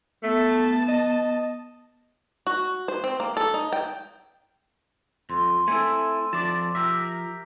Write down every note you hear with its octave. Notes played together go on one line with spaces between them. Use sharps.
A3 B3 A5
D#5
F#4
C5
C4
A#3
A4
D#4
G5
F2 C6
A3 C4 E4 A4 G#5
F2 F3 D5 A5
G4 A#4 E5